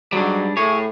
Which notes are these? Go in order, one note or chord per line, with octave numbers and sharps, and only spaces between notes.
G#2 F#3 G3 D4
A2 G#4 C#5